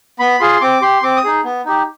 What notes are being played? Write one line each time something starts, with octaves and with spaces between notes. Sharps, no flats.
B3 B5
F4 G#4 C6
C4 D6
G4 C6
C4 D6
D#6
D#4 G#4
B3
D#4 G4